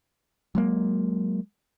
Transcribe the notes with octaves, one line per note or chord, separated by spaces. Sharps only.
F#3 G#3 A#3